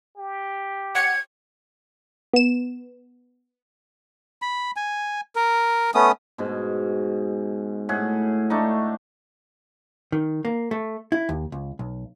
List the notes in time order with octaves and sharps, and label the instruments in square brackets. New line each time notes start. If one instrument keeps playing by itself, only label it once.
[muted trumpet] G4
[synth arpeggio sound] F#5 C#7 [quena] G#6
[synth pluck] B3 E7
[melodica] B5
G#5
A#4
A3 B3 C#4 D#6
[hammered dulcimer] G#2 B2
A2 G#4 F#5
A3 D4 D#4
[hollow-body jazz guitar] D#3
A#3
A3
E4
D#2
C#2
B1